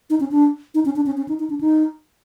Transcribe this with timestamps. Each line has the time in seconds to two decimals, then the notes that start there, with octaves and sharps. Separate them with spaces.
0.10 D#4
0.20 C#4
0.31 D4
0.75 D#4
0.85 C#4
0.96 D4
1.06 C#4
1.17 C#4
1.28 D#4
1.40 D#4
1.50 D4
1.61 D#4